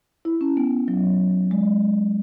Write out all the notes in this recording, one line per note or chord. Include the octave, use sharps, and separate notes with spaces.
E4
C#4
B3
F#3
G#3